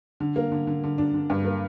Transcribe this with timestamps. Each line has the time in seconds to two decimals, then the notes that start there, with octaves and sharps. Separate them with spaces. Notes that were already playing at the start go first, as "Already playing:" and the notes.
0.20 D3
0.36 A#3
0.52 D3
0.67 D3
0.84 D3
0.98 D4
1.14 D3
1.30 G2
1.45 A#3